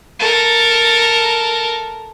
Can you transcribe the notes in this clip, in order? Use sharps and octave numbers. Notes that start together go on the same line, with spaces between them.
A4 A#4